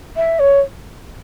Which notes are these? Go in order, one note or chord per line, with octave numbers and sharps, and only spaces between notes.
E5
C#5